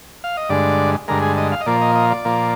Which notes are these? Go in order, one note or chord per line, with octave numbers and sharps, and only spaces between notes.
F5
D#5
G2 D3 G#3 D5
G2 D3 G#3 A#4
G#4
D#5
F5
D#5
A#2 F3 A#3 D5
D#5
D#5
D5
A#2 F3 A#3